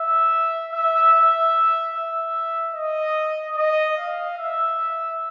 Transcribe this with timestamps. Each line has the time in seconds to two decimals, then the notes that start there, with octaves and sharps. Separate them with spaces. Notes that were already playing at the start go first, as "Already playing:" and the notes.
Already playing: E5
0.72 E5
1.14 E5
1.94 E5
2.75 D#5
3.57 D#5
3.97 F5
4.38 E5